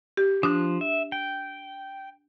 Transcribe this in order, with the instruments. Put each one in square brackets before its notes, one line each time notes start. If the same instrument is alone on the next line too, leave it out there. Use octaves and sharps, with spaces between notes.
[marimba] G4
[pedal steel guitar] F3 F#6 [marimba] D4 D#6
[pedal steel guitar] E5
G5